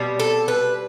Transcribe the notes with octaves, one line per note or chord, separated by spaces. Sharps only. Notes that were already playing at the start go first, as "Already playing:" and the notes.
Already playing: B2 G3 C4
A4
B4